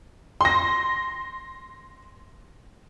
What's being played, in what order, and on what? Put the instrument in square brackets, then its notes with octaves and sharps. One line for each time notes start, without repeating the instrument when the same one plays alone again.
[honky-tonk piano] C6 A#6